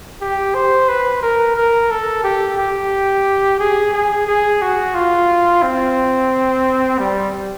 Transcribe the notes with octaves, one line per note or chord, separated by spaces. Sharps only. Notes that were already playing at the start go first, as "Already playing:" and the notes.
G4
C5
B4
A#4
A#4
A4
G4
G4
G#4
G#4
G#4
F#4
F4
C4
G3